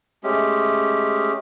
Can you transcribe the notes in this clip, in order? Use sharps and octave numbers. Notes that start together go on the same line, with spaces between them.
G#3 A3 C#4 G4